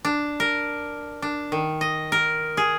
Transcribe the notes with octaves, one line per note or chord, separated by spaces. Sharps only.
D4
A#4
D4
D#3
D#5
A#4
G#4